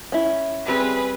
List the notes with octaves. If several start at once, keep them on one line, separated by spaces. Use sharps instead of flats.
C#4 E4
G3 C4 G4 G#4 B4